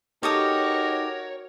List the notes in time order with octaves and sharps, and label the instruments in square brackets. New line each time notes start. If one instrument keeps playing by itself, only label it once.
[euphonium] D#4 [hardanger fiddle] F#4 A#4 [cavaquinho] G4 A4 D#6 [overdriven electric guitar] C#5